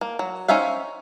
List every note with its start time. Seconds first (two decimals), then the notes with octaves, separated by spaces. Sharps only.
0.01 A#3
0.19 F#3
0.48 C#4 D#4 C5 E5 F5